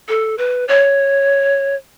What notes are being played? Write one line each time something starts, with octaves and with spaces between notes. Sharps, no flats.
A4
B4
C#5